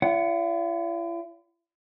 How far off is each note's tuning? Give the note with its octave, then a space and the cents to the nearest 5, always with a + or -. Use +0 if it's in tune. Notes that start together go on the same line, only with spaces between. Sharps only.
E4 +45 D5 -45 F#5 +0